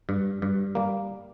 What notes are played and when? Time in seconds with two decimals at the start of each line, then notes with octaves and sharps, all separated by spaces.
0.09 G2
0.42 G2
0.75 G3 A#3